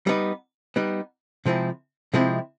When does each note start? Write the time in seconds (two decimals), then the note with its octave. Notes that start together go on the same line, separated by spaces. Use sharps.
0.07 G3 B3 D#4
0.76 G3 B3 D#4
1.46 C3 F3 G#3 C4 E4
2.14 C3 F3 G#3 C4 E4